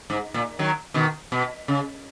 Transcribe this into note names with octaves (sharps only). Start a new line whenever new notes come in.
G#2
A#2
D#3 F#3
B2 D#3
B2
C#3